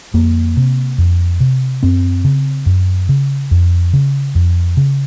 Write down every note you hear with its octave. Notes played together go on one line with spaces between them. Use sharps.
F2 A#3
C3
F2
C3
F#2 C4
C#3
F#2
C#3
F2
C#3
F2
C#3